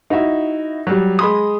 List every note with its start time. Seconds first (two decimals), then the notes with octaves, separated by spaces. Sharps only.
0.10 D#4 E4 F#4 E5
0.87 F#3 G3
1.19 G#3 B5 C6 D#6